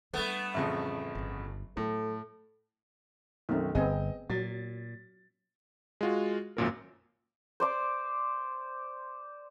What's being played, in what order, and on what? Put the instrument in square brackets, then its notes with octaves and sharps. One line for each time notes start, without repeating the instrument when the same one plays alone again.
[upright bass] G3 D4 [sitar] A3 B3
[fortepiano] A1 F2 C#3
[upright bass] G1 F#3
[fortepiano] A2 [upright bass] F#3 [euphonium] A4
[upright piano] B1 F#2 D#3 [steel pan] A3 C4
[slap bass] G1 [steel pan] B3 C4 G#4 [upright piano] D#5
[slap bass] A#2 [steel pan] F#3 [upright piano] A6
[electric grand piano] G#3 F4 F#4
G#1 F#2 A#2 A#4
[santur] C5 D5 D6